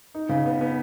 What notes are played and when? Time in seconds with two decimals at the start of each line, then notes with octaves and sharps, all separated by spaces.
0.15 D#4
0.29 C#3
0.45 B3
0.61 B3